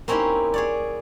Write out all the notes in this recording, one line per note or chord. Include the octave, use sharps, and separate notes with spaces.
A#3 C4 C#4 D#4 E4 G4
G#4 C#5 D5